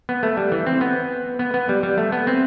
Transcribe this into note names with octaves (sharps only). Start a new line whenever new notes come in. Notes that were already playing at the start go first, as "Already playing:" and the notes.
B3
A3
G3
E3
C4
B3
B3
B3
G3
G3
A3
B3
C4